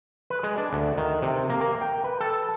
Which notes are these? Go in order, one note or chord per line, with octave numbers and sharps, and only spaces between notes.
B4
G#3
D4
D2
D#3
C3
A#3
A#3
G5
B4
A4